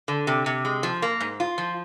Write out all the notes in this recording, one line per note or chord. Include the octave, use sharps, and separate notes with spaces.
D3
C3
C3
G#3
F3
A#3
G#2
F4
F3